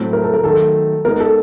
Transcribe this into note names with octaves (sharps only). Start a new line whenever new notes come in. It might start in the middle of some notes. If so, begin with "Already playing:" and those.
Already playing: A2 F#3 A3 C4 E4
A#4
A4
A#4
D#3 F#3 A3 A4
G#3 B3 D#4 A#4
A4